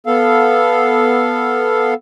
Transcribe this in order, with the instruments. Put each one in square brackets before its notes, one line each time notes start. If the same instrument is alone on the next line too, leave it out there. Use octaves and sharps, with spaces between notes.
[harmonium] B3 A4 F5